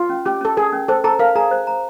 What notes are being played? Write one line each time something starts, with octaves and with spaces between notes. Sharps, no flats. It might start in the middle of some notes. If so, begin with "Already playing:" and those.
Already playing: F4
C#4
C#4 G4
C#4 A4
G#4 A#4
C#4
A4 C5
A4 A#5
A#4 F5
G#4 A#5
C5
A#5